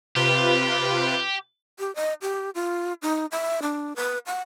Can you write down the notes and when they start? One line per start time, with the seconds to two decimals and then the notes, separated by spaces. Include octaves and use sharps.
0.16 C3 F4 G4 B4
1.79 G4
1.95 D#5
2.22 G4
2.55 F4
3.02 D#4
3.32 E5
3.62 D4
3.96 B4
4.26 F#5